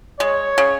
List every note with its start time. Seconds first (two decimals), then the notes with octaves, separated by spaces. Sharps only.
0.20 G#3 C#5
0.58 C#3